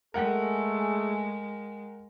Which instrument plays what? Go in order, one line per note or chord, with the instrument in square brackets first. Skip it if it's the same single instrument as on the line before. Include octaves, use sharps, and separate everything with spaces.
[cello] G#3 [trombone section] A3 G#4 [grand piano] A#4 F#5 G5